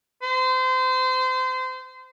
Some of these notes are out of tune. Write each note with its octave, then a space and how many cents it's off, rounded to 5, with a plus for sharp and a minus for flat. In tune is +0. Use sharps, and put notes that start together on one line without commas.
C5 -30